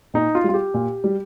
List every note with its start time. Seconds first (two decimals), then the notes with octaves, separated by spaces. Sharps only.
0.14 A#2 D#4
0.35 F4
0.44 G3
0.49 F4
0.54 G4
0.74 A#2
1.04 G3